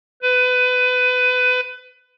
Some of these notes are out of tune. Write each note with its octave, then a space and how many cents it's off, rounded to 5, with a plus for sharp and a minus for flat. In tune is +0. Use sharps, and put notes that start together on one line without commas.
B4 +25